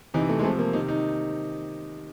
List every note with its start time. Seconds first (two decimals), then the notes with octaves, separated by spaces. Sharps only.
0.14 C3 E3 D#4
0.29 A3
0.39 G#3
0.44 C3 F3 A3
0.59 A#3
0.73 C3 D#3 D#4
0.88 D#4